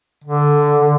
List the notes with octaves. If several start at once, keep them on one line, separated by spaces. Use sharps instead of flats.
D3
D3